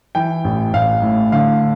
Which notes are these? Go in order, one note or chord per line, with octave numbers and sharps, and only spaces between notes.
E3 G5
A1
A1 F5
A2
D3 F5